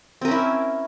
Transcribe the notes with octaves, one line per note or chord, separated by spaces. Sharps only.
C4 C#4 E4 A#4